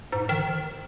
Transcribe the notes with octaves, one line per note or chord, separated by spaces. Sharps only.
G#2
D#3